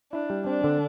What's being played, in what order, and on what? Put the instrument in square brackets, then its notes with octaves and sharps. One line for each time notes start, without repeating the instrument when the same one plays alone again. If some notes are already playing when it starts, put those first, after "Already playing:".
[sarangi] D4 [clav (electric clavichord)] E4
[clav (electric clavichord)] G3
[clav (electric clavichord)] C4 [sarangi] D4
[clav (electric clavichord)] D3